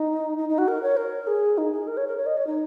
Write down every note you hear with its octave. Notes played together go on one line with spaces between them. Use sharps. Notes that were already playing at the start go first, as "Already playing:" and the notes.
Already playing: D#4
D#4
D#4
F#4
A#4
C#5
A#4
G#4
D#4
G#4
A#4
C#5
A#4
C#5
D#5
C#5
D#4